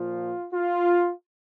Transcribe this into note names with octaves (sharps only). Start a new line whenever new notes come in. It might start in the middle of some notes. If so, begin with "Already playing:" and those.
Already playing: A#2 F3 F4
F4